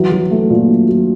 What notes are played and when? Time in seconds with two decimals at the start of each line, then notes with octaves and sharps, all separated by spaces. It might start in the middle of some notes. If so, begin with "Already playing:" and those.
Already playing: E3 F#3
0.12 F#3
0.31 A3
0.50 A#2
0.69 F#3
0.88 F#3